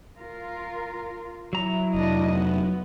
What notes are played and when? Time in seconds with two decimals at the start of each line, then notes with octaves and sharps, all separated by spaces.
0.18 F4 A#4
1.53 F#3 E4 A#5
1.94 F1 D4 D#5
2.33 B3